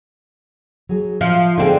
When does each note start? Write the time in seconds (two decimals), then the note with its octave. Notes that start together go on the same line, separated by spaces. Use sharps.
0.89 F#3 G#4
1.21 F3 E5
1.58 D3 C4 D#4 G#4